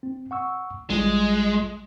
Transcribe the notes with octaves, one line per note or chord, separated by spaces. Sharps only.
C4
F#5 C#6 E6
A1 G3 G#3 F4